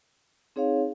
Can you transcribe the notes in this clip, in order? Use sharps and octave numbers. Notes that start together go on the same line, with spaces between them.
C4 D#4 G#4 C#5 F5